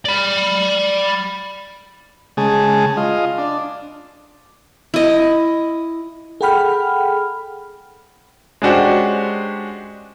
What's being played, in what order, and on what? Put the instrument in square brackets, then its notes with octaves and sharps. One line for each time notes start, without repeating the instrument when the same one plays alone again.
[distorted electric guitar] D5 B5
[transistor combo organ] C#3 G#3 G#4 A5
F4 D#5
D4
[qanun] E4 D#5
[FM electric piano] G#4 A4 F#5 G5 B5 F6
[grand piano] G#3 C#4 D4 F#4 G4 C5